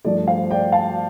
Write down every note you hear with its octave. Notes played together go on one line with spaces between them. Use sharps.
G2 F3 A3 D5
C5 F5
D5 G5
F5 A5